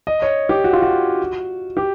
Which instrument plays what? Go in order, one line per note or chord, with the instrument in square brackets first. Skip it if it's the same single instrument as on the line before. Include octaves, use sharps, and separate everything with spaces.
[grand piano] D#5
C#5
G4
F#4
F4
F#4
G4